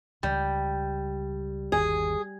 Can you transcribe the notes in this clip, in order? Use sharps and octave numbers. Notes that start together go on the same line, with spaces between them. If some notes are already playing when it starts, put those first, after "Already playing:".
C#2 G3
G1 D#2 G#4